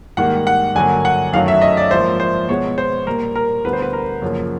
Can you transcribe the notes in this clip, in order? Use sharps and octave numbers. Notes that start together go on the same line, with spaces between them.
G#2 D#3 G3 A#3 F#5
F#5
G2 D3 F#3 A#3 G#5
F#5
F#2 D#3 F#3 A3 F5
E5
D#5
D5
G#2 F3 A#3 C5
C5
B2 G#3 B3 C#5
C5
A#2 G3 A#3 A#4
A#4
D2 D3 G3 B3 B4
C5
B4
A#4
F#2 C#3 F3 A#3